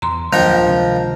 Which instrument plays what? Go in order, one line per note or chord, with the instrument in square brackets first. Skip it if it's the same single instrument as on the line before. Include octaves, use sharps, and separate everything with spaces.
[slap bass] E2 [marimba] A#5 C6
[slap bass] D1 F#3 A#3 [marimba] D2 D#3 [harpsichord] F3 A#4 G5
[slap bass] C3 G#3